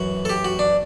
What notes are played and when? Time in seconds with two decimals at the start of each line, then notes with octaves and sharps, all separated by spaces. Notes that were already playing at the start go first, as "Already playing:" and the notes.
Already playing: F#2 E3 F#4
0.25 A4
0.29 G4
0.45 F#4
0.59 D4